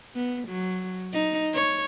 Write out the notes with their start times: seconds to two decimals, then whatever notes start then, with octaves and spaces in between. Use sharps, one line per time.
0.15 B3
0.48 F#3
1.12 D#4
1.53 C#5